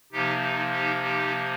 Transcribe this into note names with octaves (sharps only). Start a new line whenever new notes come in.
C3 F3 A#3 D#4 G4
D#4
D#4 G4
D#4 G4